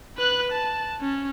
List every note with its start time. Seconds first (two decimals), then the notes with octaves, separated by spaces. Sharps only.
0.18 B4 F#6
0.52 A5
1.01 C#4